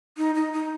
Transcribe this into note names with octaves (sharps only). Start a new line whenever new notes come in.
D#4
D#4
D#4